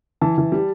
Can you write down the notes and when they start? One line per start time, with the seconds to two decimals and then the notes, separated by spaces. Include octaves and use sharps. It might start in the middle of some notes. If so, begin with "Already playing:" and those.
0.21 E3 A5
0.38 E3
0.52 G3